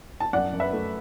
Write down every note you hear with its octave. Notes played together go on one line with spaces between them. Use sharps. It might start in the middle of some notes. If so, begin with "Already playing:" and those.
A5
F#2 D5 F#5
F#2
B4 E5
A3